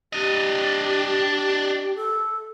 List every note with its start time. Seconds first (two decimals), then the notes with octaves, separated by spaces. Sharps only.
0.13 D4 G4 D#5
1.95 A4